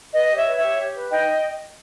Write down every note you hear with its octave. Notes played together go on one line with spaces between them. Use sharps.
B4 D#5
G4
C#5 E5
B4
C#5 E5
G4
G4
B4
D#4 D#5 G5